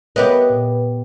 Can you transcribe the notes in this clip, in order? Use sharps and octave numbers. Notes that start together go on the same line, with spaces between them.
B3 G4 A#4 B4 C#5 D#5 E5
A#2